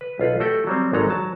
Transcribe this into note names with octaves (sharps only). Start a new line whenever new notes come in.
B4
B1 F4 A4 B4
A3 F#4 G4 A4 G5
F#3 G3 C4
G#1 F#3 G#3 D#4 A4 A#5
F#3 A5